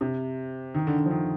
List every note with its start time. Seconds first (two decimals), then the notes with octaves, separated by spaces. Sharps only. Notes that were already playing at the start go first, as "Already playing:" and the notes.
0.01 C3
0.74 D#3
0.87 D3
0.99 D3
1.06 F3
1.11 D#3